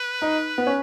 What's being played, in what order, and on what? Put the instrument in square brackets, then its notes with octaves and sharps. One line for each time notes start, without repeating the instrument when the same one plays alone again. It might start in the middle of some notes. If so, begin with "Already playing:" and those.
Already playing: [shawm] B4
[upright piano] D#4
B3
C#4